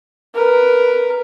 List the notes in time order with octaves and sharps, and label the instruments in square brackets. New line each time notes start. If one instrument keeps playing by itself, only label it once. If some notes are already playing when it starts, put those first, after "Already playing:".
[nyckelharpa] A#4 B4